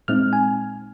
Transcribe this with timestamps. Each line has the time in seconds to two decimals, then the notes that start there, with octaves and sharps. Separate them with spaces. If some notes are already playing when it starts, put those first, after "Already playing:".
0.08 A#2 G#3 C4 D#4 F6
0.33 G#5